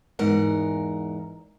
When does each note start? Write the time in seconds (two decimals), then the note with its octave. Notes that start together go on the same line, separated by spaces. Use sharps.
0.19 E2 G#2 A#4 F#5